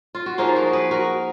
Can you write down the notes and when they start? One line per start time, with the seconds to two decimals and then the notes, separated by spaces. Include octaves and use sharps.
0.15 F4
0.26 F#4
0.38 F3 A#3 D#4 F4 G#4
0.55 F#4 A#4
0.73 G#4 B4
0.91 F#4 A#4